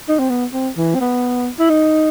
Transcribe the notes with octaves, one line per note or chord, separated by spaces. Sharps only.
D#4
C4
B3
C4
E3
C4
B3
E4
D#4